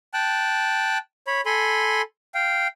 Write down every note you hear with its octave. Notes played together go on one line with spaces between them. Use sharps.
G5 A5 F#6
C#5 B5
A4 G#5 B5 C6
F5 G5